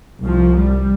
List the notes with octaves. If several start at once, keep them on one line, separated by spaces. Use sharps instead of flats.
C2 F3
G3